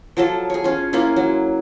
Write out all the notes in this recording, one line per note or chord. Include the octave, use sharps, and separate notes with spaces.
F3 F#3 F4 A4
G#4 C#5
C#4 F4
A#3 C#4 E4 F4
F#3